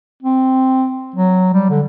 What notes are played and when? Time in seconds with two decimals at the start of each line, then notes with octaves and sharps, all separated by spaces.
0.23 C4
1.16 F#3
1.53 G3
1.70 D3